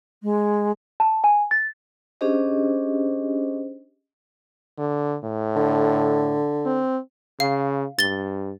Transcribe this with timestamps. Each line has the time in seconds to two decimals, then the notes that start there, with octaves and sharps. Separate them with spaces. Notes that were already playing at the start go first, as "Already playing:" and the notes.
0.23 G#3
1.00 A5
1.24 G#5
1.51 A6
2.21 C#4 D4 G4 G#4 C5 D#5
4.78 D3
5.24 A2
5.56 D3
6.66 C4
7.40 C#3 F5
7.99 G2 A6 G7